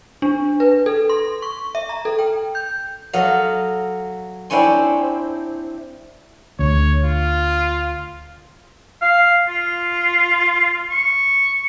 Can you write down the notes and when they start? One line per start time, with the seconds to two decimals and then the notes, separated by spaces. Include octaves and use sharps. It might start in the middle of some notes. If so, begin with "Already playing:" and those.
0.22 D4
0.60 B4
0.86 A4
1.09 C6
1.42 C#6
1.75 E5
1.89 A#5
2.05 A4
2.19 G5
2.55 G6
3.13 F#3 A4 D#5 F5
4.50 C4 D4 E4 C#5 G#5 C6
6.59 D2 C#5
7.04 F4
9.01 F5
9.48 F4
10.90 C#6